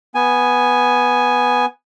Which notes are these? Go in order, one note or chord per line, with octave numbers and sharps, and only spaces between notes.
B3 G#5